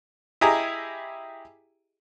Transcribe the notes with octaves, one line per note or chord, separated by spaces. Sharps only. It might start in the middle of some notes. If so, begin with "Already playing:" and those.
E4 G4 G#4 D#5 G#5 A#5